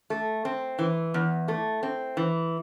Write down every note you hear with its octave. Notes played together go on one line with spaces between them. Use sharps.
A3
C4
E3
E2
A3
C4
E3